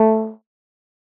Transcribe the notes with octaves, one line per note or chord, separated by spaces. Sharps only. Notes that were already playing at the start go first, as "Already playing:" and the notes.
Already playing: A3